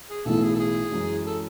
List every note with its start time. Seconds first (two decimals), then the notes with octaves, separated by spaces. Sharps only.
0.10 G#4
0.25 B1 A2 E3 B3 A4
0.43 G#4
0.54 A4
0.59 G#4
0.92 F#2 E3 G#3 C#4
1.26 A4